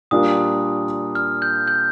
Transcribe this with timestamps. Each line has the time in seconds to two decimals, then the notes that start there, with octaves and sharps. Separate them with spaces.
0.11 A#2 G3 D4 F4 A#4 D#6
1.15 F6
1.42 G6
1.67 G6